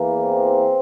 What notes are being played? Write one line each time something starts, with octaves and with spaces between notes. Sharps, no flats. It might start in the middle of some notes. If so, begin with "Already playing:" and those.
Already playing: E2 E3 A#3
C4